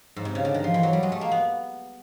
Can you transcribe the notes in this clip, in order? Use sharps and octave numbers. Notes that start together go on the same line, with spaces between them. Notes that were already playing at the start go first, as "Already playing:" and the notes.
G#2
C3
C#3
D3
D#3
F3
E3
F#3
G3
G#3
A3
A#3
B3